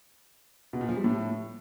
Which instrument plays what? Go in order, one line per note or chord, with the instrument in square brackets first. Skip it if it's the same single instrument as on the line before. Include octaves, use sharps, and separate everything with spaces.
[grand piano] B2
A#2
F3
G3
A2